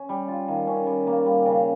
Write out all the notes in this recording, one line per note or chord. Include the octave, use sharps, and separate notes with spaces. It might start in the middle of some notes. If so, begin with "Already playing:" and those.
Already playing: C#4
G3
F4
D#3
C#4
G3
A#3
G3
C#3